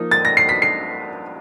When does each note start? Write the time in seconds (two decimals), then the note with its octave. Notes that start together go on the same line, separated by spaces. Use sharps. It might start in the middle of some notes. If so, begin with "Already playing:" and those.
Already playing: F3 A#3 D#4
0.11 A6
0.25 A#6
0.37 C7
0.49 B6
0.62 C7